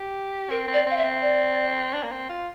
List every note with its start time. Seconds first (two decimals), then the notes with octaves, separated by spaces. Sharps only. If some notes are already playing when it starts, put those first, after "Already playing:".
Already playing: G4
0.50 C4 A#4
0.68 C4
0.73 D5
0.86 C4 F5
0.97 E5
1.04 C4
1.22 D5
1.93 D4
2.03 A#3
2.12 C4
2.29 F4